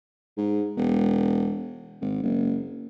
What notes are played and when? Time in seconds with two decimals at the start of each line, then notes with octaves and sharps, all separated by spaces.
0.37 G#2
0.77 E1
2.01 G#1
2.23 F#1